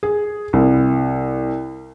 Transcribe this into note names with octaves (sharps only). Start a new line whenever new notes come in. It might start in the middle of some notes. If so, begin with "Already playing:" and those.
G#4
C2